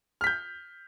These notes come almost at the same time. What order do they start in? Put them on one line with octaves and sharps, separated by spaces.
F6 B6 G6